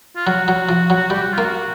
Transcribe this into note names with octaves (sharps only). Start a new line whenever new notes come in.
F4
F#3 F#4
F#3
F3
F#3
G3 G4
F#4
A#3 F4
F#4